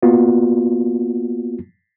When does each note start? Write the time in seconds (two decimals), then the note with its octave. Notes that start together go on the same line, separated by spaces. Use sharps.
0.03 A#3 B3 F4 F#4